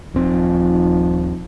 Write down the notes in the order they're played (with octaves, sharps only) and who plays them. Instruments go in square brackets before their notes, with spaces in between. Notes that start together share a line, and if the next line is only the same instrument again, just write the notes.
[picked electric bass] D#1 C4 [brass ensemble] F3 D#4